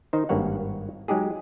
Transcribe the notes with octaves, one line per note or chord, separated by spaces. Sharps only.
D#3 D#4 C5
G#1 G2 A#3 C#5 F#5
F#3 G#3 D#4 G4 G#4